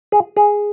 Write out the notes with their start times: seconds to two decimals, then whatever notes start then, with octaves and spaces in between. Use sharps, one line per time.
0.12 G#4
0.37 G#4